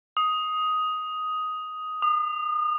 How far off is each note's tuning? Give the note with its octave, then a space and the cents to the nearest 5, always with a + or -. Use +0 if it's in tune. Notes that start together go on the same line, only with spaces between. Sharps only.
D#6 +10
D#6 -35